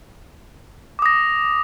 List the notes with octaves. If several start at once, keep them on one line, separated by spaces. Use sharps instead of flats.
D6 D#6 A#6